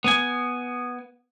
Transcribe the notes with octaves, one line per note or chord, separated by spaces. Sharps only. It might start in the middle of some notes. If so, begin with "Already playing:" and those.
B3 G#5